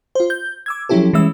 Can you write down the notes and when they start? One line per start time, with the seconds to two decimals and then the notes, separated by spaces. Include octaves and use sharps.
0.15 F4 C5
0.30 G6
0.66 D6 E6 G#6
0.89 F3 F#3 C#4 E4 G4 A4
1.13 E3 G3 G#3 C#4 E5 E6